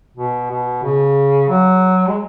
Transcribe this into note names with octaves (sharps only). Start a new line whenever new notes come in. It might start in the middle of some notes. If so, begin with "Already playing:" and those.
B2
B2
C#3
F#3
G#3